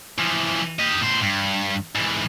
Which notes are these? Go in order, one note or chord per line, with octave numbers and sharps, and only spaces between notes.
E3 F3
G4 D#5
A2 C5
G2
G#2 E3